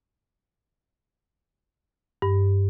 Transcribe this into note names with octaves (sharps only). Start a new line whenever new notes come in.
G2